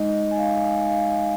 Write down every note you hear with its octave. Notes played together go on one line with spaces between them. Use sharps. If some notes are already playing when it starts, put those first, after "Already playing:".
Already playing: G#3 D#4 D#5
G#5
F5
D#5
F5
D#5
G#5